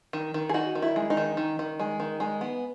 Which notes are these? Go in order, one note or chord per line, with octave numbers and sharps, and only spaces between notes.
D#3
D#3
G#4
D#4 F#4
D#3
E4
G#3
D#4
D#3
D#3
D#3
G#3
D#3
G#3
B3